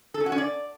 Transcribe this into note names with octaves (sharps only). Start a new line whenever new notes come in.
A4
C#4
F#4
C#4
D5